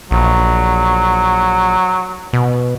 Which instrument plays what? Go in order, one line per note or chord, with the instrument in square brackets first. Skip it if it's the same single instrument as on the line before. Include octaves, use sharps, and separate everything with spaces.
[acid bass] A#1 [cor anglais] F#3
[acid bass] B2